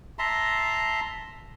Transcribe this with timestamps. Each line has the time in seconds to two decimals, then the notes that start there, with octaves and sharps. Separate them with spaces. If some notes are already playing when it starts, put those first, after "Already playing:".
0.19 E5 A5 A#5 C6